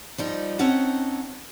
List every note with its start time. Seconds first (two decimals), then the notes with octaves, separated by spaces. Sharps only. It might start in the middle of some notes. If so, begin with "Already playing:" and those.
0.18 F3 G3 D#4
0.59 C4 C#4 D#4 F#5 A5